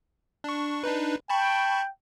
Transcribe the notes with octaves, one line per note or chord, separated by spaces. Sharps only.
D4 C#6
D4 D#4 B4
G5 A5 B5 C#6